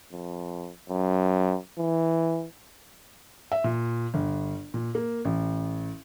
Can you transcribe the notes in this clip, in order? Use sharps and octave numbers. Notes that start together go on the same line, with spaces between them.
F2
F#2
E3
E5
A#2
G1
A#2
A#3
A1